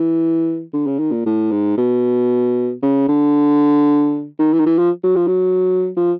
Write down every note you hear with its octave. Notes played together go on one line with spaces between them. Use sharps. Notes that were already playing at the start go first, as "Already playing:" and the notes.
Already playing: E3
D3
C#3
D#3
A#2
A2
G#2
B2
C#3
D3
D#3
E3
D#3
E3
F3
F#3
F3
F#3
F3